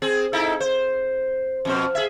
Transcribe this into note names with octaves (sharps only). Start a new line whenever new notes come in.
C4 G#4
D#4 E4 A4
C5
F2 B2 C5
G#4 E5